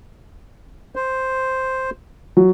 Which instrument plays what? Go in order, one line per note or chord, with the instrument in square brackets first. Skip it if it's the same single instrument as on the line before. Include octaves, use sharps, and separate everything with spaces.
[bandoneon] C5
[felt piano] F#3